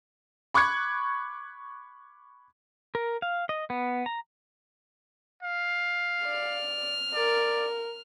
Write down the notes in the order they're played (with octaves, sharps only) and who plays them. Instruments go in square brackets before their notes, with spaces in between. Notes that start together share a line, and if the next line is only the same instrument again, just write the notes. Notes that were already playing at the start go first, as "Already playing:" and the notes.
[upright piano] B5 C#6 D6 F#6 G#6 C#7
[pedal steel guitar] A#4
F5
D#5
B3
A#5
[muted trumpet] F5
[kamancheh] D5 [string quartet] F6
[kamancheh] A#4 [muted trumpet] D5